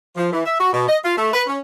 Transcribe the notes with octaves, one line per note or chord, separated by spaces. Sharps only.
F3
E3
E5
F#4
B2
D#5
F4
A3
B4
C#4